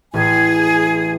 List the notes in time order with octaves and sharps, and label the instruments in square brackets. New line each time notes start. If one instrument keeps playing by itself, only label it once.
[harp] A1 [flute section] G#4 G#5